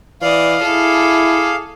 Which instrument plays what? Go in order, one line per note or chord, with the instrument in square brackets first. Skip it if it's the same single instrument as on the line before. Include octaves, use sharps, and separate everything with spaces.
[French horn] E3 [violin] D5 D#5 [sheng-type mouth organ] F5
[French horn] E4 [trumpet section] G#4 D6 [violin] A4